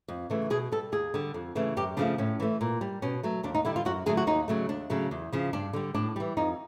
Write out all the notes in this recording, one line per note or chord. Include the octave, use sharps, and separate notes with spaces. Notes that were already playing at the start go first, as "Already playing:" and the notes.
F2
C#3 E3 A3
B2 G#4
G3 A4
D#2 G#4
D3 G3
F2
C#3 E3 A3
F#2 G4
C#3 F3 A3 D4
A2 C#4
E3 A3
A#2
G3
B2 C#4
F#3 A3
D#2 D4
D#4
D3 G3 E4
F4
F#2 F#4
D3 F#3 A3 G#4
F#4
D#2 D#4
C#3 F#3 A3
D#2 D4
C#3 F#3 A3
E2
C#3 F3
G2 D4
D3 G3
A2 D4
E3 G3
F2 D#4